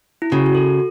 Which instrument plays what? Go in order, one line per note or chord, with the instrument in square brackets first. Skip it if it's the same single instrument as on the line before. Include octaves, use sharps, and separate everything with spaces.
[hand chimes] E4
[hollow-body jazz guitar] C#3 [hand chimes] F#4
[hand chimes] F#4
A4